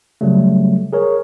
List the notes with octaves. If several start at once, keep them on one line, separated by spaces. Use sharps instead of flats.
C#3 F#3 G3 A3
G#4 A#4 C#5